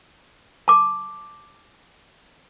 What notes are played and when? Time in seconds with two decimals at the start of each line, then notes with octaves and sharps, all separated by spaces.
0.68 A5 D6